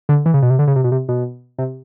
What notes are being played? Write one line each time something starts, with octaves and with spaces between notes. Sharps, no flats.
D3
E3
C#3
B2
C3
D3
C#3
C3
B2
C3
B2
C3